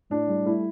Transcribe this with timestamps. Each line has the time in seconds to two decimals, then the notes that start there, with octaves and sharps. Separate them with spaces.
0.10 A2 D4
0.28 G3
0.45 A3 E4